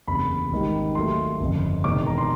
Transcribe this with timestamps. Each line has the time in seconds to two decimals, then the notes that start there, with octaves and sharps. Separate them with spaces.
0.08 F#1 E2 C3 B5
0.51 G#1 G#2 D#3 G3
0.95 D#2 D#3 F#3 A3 C6
1.40 G1 F2 C#3
1.84 E1 E2 C3 D#3 D6
2.06 A#5
2.18 C6